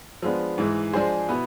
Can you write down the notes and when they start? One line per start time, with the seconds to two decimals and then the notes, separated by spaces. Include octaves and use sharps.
0.22 F3 G#3 B3 D4
0.58 G#2 E3 G#3
0.93 F3 G#3 D4 G#4 C5
1.28 B2 B3 E4 B4